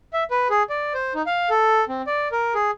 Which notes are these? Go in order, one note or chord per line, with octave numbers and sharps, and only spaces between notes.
E5
B4
G#4
D5
C5
D#4
F5
A4
C4
D5
A#4
G#4